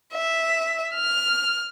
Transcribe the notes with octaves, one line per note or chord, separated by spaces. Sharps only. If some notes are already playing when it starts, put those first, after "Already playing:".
E5
F6